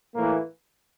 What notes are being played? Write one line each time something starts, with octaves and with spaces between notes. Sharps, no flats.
A2 E3 A#3